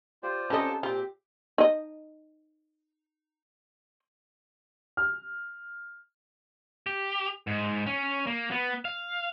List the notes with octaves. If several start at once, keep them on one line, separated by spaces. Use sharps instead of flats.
F4 G4 C5 D5
C4 C#4 G4 A4 B4 D#5 A5 A#5
A#2 C4 F4 G4
D#4 D#5
F6
G4
G#2
C#4
A#3
B3
F5